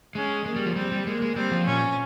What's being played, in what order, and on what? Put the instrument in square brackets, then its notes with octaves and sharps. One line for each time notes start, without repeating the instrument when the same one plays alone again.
[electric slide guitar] G#3 [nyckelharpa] C#4
[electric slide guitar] G#3 [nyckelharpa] A#3
[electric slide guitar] G3
F3
[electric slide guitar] G3 [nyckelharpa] C4
[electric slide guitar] G3
[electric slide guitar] G#3 [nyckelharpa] A#3
[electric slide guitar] G#3
[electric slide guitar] G3 [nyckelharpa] C4
[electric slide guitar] F3
[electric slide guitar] A#2 [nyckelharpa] C#4